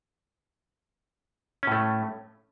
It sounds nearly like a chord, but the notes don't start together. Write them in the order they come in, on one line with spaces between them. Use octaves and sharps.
C#4 A2 A3